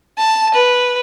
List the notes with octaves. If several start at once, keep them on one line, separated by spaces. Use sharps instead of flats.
A5
B4